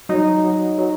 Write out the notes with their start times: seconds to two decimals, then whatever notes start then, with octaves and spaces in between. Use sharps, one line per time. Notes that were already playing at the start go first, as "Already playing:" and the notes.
0.09 F#3 D#4
0.44 F#3
0.78 F#3